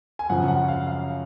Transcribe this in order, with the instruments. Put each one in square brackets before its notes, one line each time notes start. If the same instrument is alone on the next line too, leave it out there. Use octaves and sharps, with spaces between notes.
[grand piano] G#5
F#2 C#3 F3 F#5
F#5
F5
F5